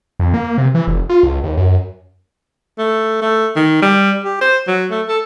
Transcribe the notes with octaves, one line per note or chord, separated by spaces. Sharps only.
F2
A#3
C3
E3
F1
F4
C#2
D#2
F#2
A3
A3
D#3
G3
G4
C5
F#3
A3
A4